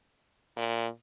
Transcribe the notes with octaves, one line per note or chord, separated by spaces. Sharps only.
A#2